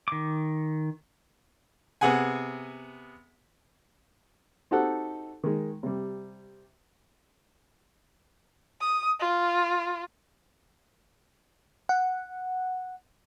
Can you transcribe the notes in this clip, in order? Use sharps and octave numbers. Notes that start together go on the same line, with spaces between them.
D#3 D6
C3 B3 G#4 F#5 G#5
C4 D#4 F#4 G4 A4 F#5
D#3 G#3
C3 G3
D#6
F4
F#5